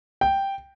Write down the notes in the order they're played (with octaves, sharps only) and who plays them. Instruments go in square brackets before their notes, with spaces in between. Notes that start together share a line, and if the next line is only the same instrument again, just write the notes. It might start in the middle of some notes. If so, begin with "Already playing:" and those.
[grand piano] G5